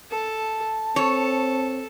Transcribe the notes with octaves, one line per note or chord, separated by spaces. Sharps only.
A4 A5
C4 A4 C#5